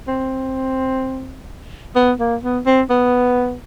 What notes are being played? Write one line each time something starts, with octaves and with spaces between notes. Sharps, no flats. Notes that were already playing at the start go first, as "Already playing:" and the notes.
C4
B3
A#3
B3
C4
B3